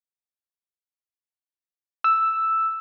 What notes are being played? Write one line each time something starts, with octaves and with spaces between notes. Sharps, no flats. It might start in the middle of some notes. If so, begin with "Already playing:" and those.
E6